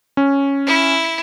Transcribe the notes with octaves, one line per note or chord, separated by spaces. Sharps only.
C#4
E4